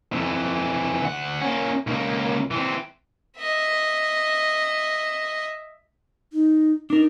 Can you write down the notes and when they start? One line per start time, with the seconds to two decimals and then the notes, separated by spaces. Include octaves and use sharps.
0.12 F2 E3
1.03 D2 F#5
1.42 A#3 C#4
1.87 C#2 A#3
2.51 E3 C4
3.38 D#5 E5
6.33 D#4
6.90 D4 D#4 A#4